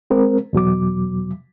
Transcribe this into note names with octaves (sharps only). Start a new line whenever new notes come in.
G#3 C4 A#4
E2 B2 F#3 D6